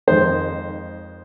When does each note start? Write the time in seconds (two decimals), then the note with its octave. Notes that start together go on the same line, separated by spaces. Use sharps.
0.07 F2 D#3 G#3 C5